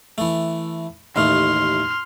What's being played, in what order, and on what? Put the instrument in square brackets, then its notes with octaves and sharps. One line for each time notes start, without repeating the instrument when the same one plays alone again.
[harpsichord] E3 A3
[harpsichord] A1 D#2 A3 [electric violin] C6 F6